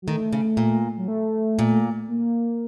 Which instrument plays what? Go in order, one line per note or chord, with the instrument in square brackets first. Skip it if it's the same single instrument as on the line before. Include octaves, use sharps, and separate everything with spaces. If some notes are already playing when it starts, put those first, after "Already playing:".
[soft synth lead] F#3
[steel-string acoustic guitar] D#3 [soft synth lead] A3
[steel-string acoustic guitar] C#3
A#2
[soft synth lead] F#3
A3
[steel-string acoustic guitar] A#2
[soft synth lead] A#3